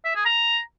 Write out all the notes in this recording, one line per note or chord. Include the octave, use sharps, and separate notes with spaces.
E5
G#4
A#5